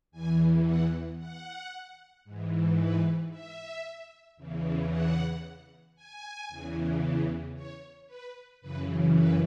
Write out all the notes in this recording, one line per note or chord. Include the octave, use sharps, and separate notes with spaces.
E2 E3 G#5
F#5
F#5
G#2 E3
B4
E5
E2 C#3 E3
F#5
G#5
E2 C#3 E3
C#5
B4
F#2 C#3 E3 B4
B4